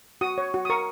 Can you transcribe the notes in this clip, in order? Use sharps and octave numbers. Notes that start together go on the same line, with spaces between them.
F#4 D#6
C#5
F#4
D#6
A#4 C#6